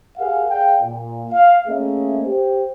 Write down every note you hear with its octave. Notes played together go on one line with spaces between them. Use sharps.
G4 G#4 A#4 F5 F#5
G#4 D5 F5 G5
A#2
F5
A3 A#3 C#4 G#4 D#5 E5
G4 C5